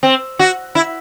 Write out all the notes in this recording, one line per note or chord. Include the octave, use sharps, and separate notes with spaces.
C4
F#4
E4